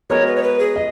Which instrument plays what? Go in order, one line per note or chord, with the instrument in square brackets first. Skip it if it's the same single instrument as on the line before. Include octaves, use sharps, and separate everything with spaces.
[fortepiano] G#3 B3 F#4 A#4 D#5 [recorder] C#5
[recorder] B4
C#5
B4
G#4
[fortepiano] D#5